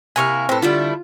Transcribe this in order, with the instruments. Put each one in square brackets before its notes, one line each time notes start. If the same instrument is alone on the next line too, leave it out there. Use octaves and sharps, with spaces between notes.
[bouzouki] C3 A#3 E4 [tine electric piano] G#5 C#6 F6
[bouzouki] A2 A4 [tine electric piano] C4 B4
[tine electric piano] D3 [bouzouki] G3 A3 E4 [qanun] F4